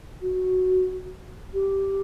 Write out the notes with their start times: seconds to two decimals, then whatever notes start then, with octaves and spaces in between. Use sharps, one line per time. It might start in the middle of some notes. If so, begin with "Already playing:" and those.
0.22 F#4
1.54 G4